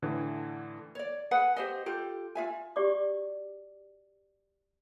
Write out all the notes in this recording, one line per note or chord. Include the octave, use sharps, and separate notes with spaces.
A2 D3 E3
C#5 D5
G#4 B4 F#5 G#5
G4 C5 D#5
F4 G4 A4
F4 E5 G#5
F#4 G4 D5 C#6 D6